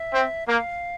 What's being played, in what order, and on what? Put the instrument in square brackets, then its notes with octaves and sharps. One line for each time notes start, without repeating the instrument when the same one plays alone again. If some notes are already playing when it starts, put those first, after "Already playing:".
Already playing: [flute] E5
[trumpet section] C4
[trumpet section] A#3 [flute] F5